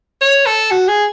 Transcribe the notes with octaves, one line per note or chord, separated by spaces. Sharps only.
C#5
A4
F#4
G#4